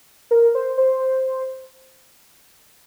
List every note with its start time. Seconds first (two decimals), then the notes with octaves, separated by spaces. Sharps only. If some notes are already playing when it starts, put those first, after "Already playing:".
0.31 A#4
0.55 C5
0.78 C5